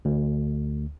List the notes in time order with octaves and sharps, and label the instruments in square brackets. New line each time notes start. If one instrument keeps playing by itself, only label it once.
[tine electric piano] D2